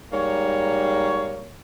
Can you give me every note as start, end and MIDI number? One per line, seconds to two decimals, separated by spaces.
0.13 1.50 44
0.13 1.50 55
0.13 1.50 58
0.13 1.50 73